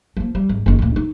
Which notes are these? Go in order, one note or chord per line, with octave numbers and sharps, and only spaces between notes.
F3 A#3
G3
G#1
F#1 D#3
D2 A#2
D#4